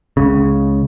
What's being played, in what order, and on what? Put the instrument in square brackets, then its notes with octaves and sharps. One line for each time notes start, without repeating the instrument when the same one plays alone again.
[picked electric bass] C#2 C#3